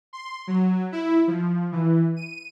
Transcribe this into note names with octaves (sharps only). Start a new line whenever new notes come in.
C6
F#3
E4
F3
E3
D#7